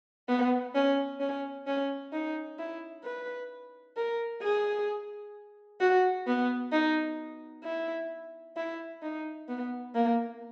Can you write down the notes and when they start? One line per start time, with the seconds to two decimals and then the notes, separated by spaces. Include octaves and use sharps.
0.29 B3
0.75 C#4
1.20 C#4
1.67 C#4
2.13 D#4
2.59 E4
3.04 B4
3.97 A#4
4.42 G#4
5.80 F#4
6.27 B3
6.72 D#4
7.64 E4
8.56 E4
9.02 D#4
9.48 B3
9.95 A#3